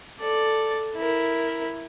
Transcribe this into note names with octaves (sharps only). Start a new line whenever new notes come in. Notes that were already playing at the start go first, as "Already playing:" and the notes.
A4 D5
E4 A#4